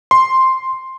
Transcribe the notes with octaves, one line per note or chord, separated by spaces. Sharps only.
C6